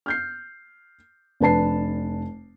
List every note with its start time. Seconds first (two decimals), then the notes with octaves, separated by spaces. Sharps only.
0.06 F6 G6 C7
1.40 F1 D4 B4 A5 C7